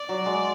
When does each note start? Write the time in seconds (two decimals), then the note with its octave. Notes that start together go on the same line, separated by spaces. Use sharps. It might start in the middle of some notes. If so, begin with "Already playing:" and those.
Already playing: D5
0.09 F#3
0.26 G#3